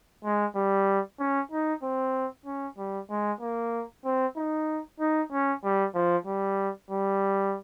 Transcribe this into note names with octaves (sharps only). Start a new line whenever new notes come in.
G#3
G3
C#4
D#4
C4
C#4
G3
G#3
A#3
C4
D#4
D#4
C#4
G3
F3
G3
G3